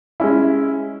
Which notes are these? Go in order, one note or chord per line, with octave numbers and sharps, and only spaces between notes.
G#3 C#4 E4